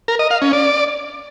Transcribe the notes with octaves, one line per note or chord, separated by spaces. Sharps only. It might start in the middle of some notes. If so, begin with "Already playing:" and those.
A#4
D#5
F5
C#4
D5